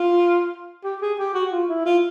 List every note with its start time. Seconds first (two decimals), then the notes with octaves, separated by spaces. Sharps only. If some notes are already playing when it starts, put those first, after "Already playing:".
Already playing: F4
0.84 G4
1.02 G#4
1.19 G4
1.34 F#4
1.52 F4
1.69 E4
1.86 F4